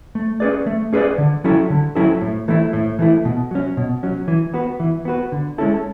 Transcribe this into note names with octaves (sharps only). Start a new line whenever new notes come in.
A3
C#4 G#4 B4 D5
A3
C#4 G#4 B4 D5
D3
F#3 C#4 E4 A4
D3
F#3 C#4 E4 A4
A2
E3 A3 E4
A2
E3 A3 E4
B2
F#3 C#4
B2
F#3 C#4
E3
B3 F#4 B4
E3
B3 F#4 B4
D3
G#3 C#4 E4 A4